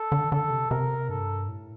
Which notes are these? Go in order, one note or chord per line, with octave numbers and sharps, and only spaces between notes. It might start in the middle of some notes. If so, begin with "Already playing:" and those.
Already playing: A4
D3
D3 A4
C3
C3 A#4
G2 A4
A2